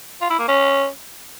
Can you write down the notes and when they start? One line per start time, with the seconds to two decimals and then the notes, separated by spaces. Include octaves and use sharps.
0.21 F4
0.30 E4
0.39 A#3
0.48 C#4